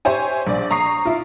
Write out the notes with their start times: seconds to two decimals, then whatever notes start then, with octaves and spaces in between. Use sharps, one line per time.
0.05 G4 C5 C#5 E5 G#5
0.47 A#1 D5
0.71 A#5 C#6 D#6 C7
1.05 E4 F4